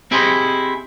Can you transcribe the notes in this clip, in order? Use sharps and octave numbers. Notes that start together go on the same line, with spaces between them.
C4 E4 G4 G#4 C5 D#5